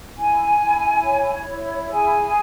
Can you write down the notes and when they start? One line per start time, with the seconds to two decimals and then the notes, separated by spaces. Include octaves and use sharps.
0.16 E4 G#5
0.60 E4
1.03 C#5
1.47 E4
1.90 G#4 G#5